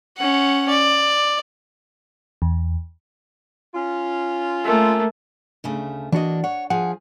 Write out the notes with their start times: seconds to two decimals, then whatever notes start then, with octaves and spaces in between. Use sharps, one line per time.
0.17 C#4 F#5
0.69 D5
2.42 E2
3.75 C#4 F4
4.64 A3 A#3
5.64 D2 C#3 A3
6.12 E3 A#3 D4 F#4 D#5
6.44 C#5 F#5
6.70 F3 G#4 F#5